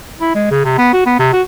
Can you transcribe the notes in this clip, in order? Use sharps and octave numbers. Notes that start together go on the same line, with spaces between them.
E4
G#3
C#3
C3
B3
F#4
B3
C3
F#4